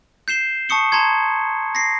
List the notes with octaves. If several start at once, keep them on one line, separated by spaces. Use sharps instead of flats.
G6 C7 E7 G7
A5 C#6 D#6 C#7 G7
A5 A#5 C6 G#6
A#6 C7